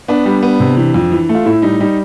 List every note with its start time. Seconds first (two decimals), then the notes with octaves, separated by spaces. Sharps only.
0.08 B3 D4
0.25 G3
0.43 B3
0.60 C3
0.77 E3
0.94 F2
1.12 E3
1.29 A3
1.35 F4
1.45 A2 E4
1.62 G3 D#4
1.80 G3 D#4